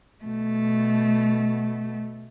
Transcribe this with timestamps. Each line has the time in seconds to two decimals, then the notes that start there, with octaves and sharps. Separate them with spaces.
0.24 B2 A3